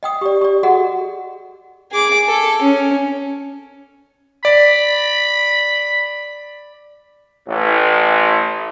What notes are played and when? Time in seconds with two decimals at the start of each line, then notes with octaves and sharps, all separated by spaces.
0.03 D#5 G5 D#6
0.21 G4 D5
0.41 G4 D5
0.63 F#4 G#4 A4 D#5 F#5
1.92 G#4 D6
2.28 A4
2.62 C#4
4.45 D5 B5
7.48 A1